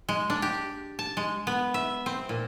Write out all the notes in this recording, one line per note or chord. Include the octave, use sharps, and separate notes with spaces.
G#3
D4
G4
A5
G#3
B3
E5
C4
A#2